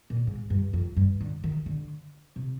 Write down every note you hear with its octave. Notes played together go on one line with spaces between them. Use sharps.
A#2
G#2
G2
F2
G2
D3
D#3
D3
C3